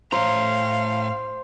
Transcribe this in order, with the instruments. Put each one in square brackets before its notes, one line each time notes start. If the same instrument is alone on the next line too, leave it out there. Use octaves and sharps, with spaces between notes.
[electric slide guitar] A2 C#5 A#5 [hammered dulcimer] C5 [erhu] F5